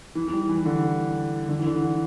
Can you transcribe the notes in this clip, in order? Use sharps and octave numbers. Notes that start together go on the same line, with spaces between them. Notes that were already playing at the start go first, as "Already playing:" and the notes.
E3
E3
G3
E3
D3
D3
E3
D3
E3